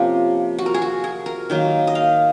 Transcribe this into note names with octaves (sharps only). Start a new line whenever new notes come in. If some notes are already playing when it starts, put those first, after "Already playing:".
Already playing: C3 F3 A#3 C#4
F#4
A#4
G#4
F#4
G#4
A#4
D#3 F#3 A#3
D#5
F5